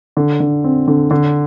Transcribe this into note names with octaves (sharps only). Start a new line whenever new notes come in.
D3
D3
C4
D3
D3